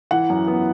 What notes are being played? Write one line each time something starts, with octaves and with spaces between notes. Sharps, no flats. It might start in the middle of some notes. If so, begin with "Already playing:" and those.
E3 F#5
F#2
B3